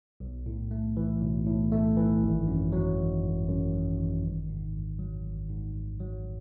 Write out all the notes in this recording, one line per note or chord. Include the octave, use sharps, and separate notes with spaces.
B1
A2
A3
E3
B1
A2
A3
E3
G#1
F#2
F#3
D#3
G#1
F#2
F#3
D#3
G#1
G#2
G#1
F#3
G#1
G#2
G#1
F#3